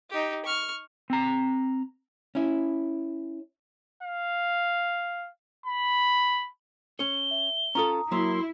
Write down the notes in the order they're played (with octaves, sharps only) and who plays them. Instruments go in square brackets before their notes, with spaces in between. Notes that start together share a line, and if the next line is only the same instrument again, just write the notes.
[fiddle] D#4 G4
C#6 F6
[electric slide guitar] C4 A#5
[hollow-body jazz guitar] C#4 E4
[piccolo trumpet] F5
B5
[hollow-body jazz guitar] C#4 C#5 [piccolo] G7
[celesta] E5
[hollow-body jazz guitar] C#4 F4 A4 [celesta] A#5 D#6
[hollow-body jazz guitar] F#3 A#3 A#4 [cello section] E4 [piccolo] C6